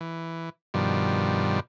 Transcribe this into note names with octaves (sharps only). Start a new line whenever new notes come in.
E3
G2 B2 D#3 F3 G3